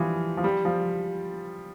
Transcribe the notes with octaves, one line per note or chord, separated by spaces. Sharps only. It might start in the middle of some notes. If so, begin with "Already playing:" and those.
Already playing: E3 F3 G3
F3
G3
F3